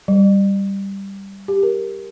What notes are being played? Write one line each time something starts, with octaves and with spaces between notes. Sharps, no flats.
G3
G4
A#4